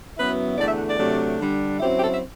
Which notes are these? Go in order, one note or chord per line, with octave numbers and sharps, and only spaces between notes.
F#2 F#3 B3 E4 B4
E2 D3 A3 D5
E5
F#5
D5
C3 F#3 A3 D4
D3 G3 D4
F#2 F#3 C4 E4 G4
G4
A4
E5